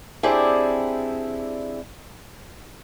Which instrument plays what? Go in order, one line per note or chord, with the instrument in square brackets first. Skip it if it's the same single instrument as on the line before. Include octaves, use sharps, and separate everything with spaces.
[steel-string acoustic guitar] C4 D4 E4 G4 G#4 D5